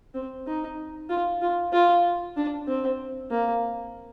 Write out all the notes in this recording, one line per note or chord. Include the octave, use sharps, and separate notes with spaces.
C4
D#4
F4
F4
F4
D4
C4
A#3